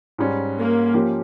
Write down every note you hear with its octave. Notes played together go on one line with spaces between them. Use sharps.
G#2 G3 C#4
A#3
F3 A#3 C#4 G4